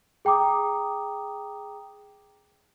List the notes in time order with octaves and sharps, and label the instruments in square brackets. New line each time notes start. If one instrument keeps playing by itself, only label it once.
[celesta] G#4 G5 A#5 D6 D#6